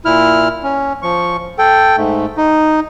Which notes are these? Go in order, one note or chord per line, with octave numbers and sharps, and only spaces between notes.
A#2 E4 F6
C#4
F3 C#6
A4 G5
G#2 A3
D#4